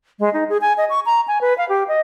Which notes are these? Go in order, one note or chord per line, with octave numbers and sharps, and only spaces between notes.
G#3
D#4
G#4
G#5
D#5
C#6
A#5
G#5
B4
F5
G4
D#5